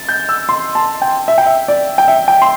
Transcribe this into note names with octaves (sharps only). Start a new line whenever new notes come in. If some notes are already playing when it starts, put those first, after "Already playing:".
Already playing: A6
G6
E6
C6
A5
G5
E5
G5
E5
D5
G5
E5
G5
C6